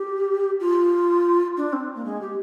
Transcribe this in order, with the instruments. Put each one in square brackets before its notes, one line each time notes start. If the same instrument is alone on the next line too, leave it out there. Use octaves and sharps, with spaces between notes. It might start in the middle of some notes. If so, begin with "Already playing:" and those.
Already playing: [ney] G4
F4
D4
C4
A#3
G#3
G4